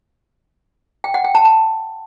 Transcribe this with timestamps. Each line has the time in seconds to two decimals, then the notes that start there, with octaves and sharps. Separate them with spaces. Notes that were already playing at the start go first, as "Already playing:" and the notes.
1.04 G5
1.14 F#5
1.24 G5
1.35 A5
1.45 A5